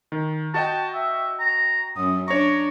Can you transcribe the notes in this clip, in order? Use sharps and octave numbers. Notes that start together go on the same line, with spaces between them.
D#3
F#4 D#5 G5 A5
E5
A#5
F#2 D#6
D4 C#5 A#5 C#6